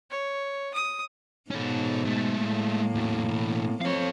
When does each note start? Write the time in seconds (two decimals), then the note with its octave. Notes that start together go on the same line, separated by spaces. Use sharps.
0.11 C#5
0.74 D#6
1.51 G#2 B2 C#4 A4
2.05 G#3 A3
2.43 A2 A#3
2.95 E2 F#3
3.28 B2 E3
3.81 F3 C4 A4 C#5 F5